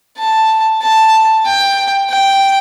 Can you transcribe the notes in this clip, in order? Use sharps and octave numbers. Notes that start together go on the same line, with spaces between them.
A5
A5
G5
G5